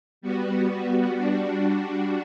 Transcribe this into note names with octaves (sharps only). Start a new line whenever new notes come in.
G3 B3 F#4
G3 D4 F#4